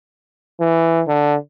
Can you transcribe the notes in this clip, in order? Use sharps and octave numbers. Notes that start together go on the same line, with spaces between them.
E3
D3